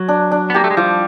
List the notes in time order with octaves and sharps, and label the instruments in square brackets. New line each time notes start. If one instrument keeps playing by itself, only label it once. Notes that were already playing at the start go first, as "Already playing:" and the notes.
Already playing: [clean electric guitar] F#3
[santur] D4
D4
[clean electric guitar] B3
[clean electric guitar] A#3 [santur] G4
[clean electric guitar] A3
G#3
[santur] F3 [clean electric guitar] G3